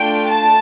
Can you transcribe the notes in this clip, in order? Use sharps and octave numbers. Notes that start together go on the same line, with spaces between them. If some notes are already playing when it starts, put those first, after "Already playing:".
Already playing: A3 D4 F4 G5
A5